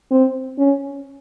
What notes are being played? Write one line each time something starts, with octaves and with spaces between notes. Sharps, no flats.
C4
C#4